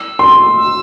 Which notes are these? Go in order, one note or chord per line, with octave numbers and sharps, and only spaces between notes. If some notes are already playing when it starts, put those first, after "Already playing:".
Already playing: E6
C6
E6